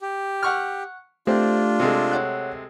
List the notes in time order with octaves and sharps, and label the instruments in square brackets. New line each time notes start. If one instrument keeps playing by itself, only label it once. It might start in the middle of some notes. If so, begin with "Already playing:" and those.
[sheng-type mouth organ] G4
[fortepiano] F#5 C#6 F6
[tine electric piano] A3 G4 [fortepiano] C4 [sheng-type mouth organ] D4 F4
[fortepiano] C3 G#3 A3
[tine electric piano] C#5 F#5 F#6